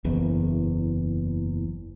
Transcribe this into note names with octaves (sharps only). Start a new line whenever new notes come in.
F#1 E2